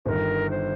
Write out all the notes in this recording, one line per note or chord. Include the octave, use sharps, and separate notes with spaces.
G1 G2 D#3 A#4 C5
C5